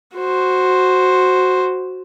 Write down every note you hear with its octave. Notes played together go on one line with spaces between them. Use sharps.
F#4 C5